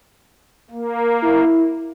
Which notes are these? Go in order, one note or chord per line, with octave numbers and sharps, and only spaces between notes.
A#3
E4